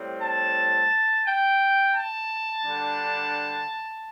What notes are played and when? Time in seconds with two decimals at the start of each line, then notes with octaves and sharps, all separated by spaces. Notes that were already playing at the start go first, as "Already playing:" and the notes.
Already playing: A2 G3 C4
0.22 A5
1.26 G5
1.96 A5
2.65 D3 G3 D4